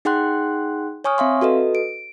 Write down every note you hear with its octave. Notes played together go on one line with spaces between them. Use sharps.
D#4 G#4 F#5 G5 C6 F#6
C#5 G#5 C#6 D#6 F6
C4 E5 F5 C6
F#4 A4 B4 D#5
D7